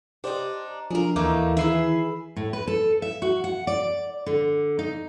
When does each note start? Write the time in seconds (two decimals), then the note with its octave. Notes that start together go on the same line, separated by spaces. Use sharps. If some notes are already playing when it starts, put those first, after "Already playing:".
0.24 D4 D#4 G4 C5 D5
0.91 F3 D4 F4 G#4 A#4
1.16 D#2 E3 A3 A#3 D#4
1.57 D#3 E4 G#4 B4 E5 C7
2.36 A2
2.53 B4
2.67 A4
3.02 E5
3.22 F#4
3.44 F#5
3.67 D5
4.26 D3
4.79 D#4